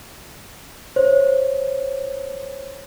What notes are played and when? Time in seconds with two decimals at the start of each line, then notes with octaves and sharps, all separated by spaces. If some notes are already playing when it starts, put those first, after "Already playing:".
0.96 C5 C#5